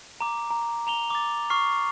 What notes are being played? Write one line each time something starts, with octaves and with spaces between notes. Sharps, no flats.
A#5 D6
A#5
A#5 F7 G7
D6 A6
C#6 F6 C7